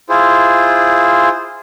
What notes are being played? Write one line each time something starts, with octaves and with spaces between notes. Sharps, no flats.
E4 F4 G#4 C5